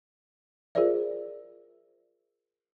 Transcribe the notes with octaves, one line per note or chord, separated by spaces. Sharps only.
F4 G#4 A#4 C5 D5 E5